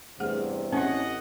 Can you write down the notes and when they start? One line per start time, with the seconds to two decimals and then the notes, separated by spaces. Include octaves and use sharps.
0.20 E2 G2 C3 A3 G#4 F#5
0.72 A1 C4 C#4 E4 D#5 F#5